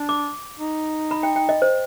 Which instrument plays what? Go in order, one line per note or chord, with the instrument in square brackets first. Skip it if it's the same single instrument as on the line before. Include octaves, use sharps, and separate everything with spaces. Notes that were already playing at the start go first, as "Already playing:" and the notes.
Already playing: [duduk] D4
[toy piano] D6
[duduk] D#4
[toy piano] B5
G5
G5
D#5
C5